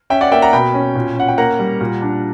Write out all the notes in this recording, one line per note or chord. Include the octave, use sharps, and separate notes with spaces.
C#4 E5 G5
D5 F#5
A#3 E5 G5
F#5 A#5
B2 G5 B5
C#4
A#2
C#4 F#5
G5
A#3 F#5 A#5
G3
A#2
D4